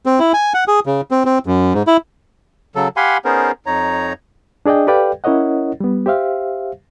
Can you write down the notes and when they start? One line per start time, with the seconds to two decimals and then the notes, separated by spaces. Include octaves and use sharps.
0.06 C4
0.19 E4
0.33 G#5
0.54 F#5
0.68 G#4
0.86 C#3
1.11 C4
1.26 C4
1.46 F#2
1.74 G#2
1.87 E4
2.75 C#3 F#3 A4
2.96 G4 F5 F#5 G#5 B5 C6
3.25 B3 C#4 D#4 G#4 A#4 C5
3.66 F2 D#4 C#5 A#5
4.66 D4 G#4 D5 D#5 G5
4.87 G4 A4 B4 D5 F5 G5
5.24 C#4 E4 A#4 C#5 D#5 F#5
5.80 G3 B3
6.06 G4 C5 E5 F5